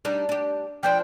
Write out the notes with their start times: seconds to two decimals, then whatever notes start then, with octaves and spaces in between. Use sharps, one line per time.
0.05 G3 D4 D#4
0.29 D4 G4
0.83 F3 D4 C5 G5